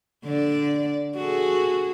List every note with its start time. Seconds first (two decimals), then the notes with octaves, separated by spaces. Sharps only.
0.25 D3 D5
1.15 F#4 G#4 A4